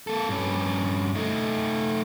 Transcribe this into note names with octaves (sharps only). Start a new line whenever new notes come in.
A#3 A4
G2 C#4
A3 D#4